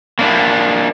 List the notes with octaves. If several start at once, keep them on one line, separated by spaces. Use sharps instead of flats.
A#3 D4 E4